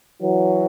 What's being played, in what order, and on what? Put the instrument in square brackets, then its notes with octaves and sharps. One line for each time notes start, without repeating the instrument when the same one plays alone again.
[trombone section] E3 F#3